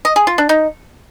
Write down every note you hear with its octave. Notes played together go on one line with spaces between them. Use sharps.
D#5
G#4
F4
D4
D#4